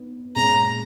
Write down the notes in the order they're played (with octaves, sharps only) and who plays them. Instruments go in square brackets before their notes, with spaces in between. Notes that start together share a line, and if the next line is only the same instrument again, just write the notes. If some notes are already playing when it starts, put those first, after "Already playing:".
Already playing: [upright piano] B3 D#4
[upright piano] A#2 G#3 C#4 G#4 [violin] A#5